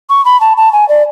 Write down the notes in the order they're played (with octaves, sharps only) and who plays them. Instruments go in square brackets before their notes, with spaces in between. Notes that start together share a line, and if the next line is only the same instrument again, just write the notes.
[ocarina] C#6
B5
A5
A5
G#5
D5